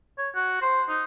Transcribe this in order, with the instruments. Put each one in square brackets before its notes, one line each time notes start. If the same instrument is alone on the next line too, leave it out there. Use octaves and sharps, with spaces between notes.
[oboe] C#5
F#4
C5
D#4